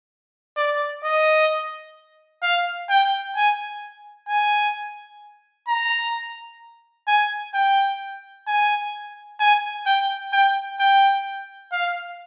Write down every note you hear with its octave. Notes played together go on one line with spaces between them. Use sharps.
D5
D#5
F5
G5
G#5
G#5
A#5
G#5
G5
G#5
G#5
G5
G5
G5
F5